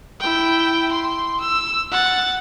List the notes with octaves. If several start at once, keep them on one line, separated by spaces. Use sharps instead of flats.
E4 G5
C6
E6
F#5 A6